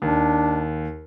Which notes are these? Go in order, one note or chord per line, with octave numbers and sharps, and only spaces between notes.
D#2 D4